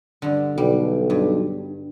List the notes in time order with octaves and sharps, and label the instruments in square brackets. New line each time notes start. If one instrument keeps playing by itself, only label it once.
[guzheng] G2 D3
[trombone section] B1 [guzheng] G3
[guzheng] G2